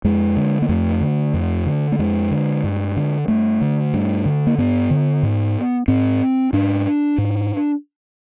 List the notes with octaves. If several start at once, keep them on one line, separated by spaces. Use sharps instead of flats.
F2 G#3
D3
A#3
F2 A3
D3
F2
D3
A3
F2 G#3
D3
G2
D3
G2 A3
D3
G2
D3
A#3
G2 B3
D3
G#2
G#2 C4
G#2 D4
G#2